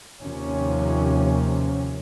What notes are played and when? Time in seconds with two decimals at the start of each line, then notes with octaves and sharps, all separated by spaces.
0.22 D#2 C3 F3 C#4